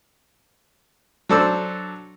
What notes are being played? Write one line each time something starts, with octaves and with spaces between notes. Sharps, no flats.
F#3 D4 A4 C5 D5 E6